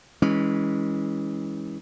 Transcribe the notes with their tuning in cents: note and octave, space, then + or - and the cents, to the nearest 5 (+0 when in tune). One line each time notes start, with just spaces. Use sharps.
E3 -25 G#3 -15 C#4 +0